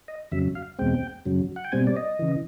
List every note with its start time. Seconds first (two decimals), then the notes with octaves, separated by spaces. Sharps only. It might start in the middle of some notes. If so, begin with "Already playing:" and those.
0.08 D#5
0.31 F2 C#3 F#3 E5
0.55 F5
0.79 E2 B2 G#3 C4 G5
1.25 F#2 C#3 F#3
1.56 F#5
1.65 G5
1.72 B2 G3 C4 G#5
1.87 D5
1.96 D#5
2.19 C#3 E3